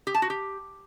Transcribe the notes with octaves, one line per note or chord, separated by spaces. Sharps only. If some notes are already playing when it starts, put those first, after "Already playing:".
G4
A5
F#4
G4